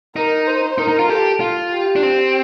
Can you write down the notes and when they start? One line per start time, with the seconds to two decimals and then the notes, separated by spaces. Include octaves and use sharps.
0.16 D#4 A#4
0.47 C5
0.78 D#4 A#4
0.88 D#4
0.99 F4
1.09 G4 A4
1.40 F4
1.72 G4
1.96 D4
2.03 C4